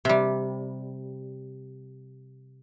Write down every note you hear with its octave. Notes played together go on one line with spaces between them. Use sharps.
C3 G3